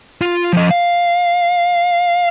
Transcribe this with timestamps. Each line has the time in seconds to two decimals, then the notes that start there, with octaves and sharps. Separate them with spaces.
0.22 F4
0.53 F3 D#5
0.71 F5